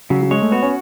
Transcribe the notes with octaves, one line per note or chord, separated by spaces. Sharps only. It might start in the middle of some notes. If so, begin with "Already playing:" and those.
C#3 F#3
F#3
G#3 C#5
A3
B3 F#4
C#4